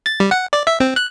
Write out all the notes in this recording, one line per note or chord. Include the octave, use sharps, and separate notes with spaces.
A6
G3
F#5
D5
E5
C4
F#6